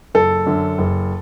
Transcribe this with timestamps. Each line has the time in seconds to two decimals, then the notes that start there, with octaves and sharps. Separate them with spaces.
0.14 F#1 A4
0.46 F#2 D3
0.78 F#1